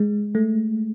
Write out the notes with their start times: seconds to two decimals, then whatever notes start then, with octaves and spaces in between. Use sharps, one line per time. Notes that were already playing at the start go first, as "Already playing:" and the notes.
Already playing: G#3
0.35 A3